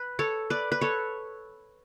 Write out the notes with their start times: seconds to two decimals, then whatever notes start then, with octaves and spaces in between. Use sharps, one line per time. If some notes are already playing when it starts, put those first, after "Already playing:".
Already playing: B4
0.19 A4 C#5
0.50 B4 D5
0.72 B4
0.81 A4 C#5